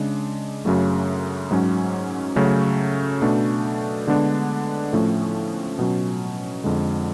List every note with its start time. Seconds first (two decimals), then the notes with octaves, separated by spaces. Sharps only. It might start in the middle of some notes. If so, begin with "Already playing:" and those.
Already playing: C#3 G#3 D4
0.65 F#2 C#3 F#3 A3
1.51 G#2 F#3 C#4
2.36 C#3 F#3 A3 C#4
3.22 B2 A3 D4
4.08 D3 G#3 B3 D4
4.93 A2 F3 A3 C#4
5.79 B2 F#3 C#4
6.64 F2 D3 G#3